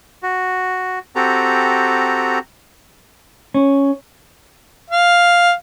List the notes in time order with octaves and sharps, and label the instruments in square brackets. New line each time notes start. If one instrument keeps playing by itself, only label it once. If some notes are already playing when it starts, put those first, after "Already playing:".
[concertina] F#4
C4 F#4 G4 A4 A#5
[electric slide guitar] C#4
[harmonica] F5